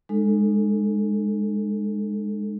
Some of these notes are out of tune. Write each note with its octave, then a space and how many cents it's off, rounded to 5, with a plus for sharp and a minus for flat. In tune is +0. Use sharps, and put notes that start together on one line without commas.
G#3 +0 D#4 -35 A4 +5